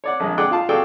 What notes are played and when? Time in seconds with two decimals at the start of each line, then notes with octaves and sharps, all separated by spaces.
0.04 C#5 D5 F#5
0.20 A#1 G#3
0.38 G#4 D5 F#5 G5 D6 F#6
0.51 F4 F5 A5
0.69 F#4 G#4 A4 D5 F5 G5